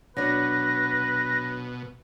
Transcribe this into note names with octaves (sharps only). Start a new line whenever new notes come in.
B2 F#3 D4 B4 A#6